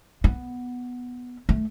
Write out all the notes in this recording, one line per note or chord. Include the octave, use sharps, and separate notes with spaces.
B3
A3